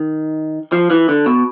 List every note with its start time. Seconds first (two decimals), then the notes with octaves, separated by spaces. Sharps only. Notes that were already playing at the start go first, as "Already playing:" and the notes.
Already playing: D#3
0.72 F3
0.90 E3
1.09 D3
1.26 B2